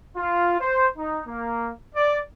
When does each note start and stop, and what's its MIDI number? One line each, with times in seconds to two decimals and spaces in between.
0.17 0.59 65
0.60 0.87 72
0.97 1.20 63
1.26 1.70 58
1.95 2.18 74